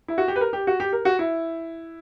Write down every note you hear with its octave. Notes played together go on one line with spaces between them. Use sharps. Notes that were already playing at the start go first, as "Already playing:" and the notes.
E4
F#4
G4
B4
A#4
G4
F#4
G4
A#4
F#4
E4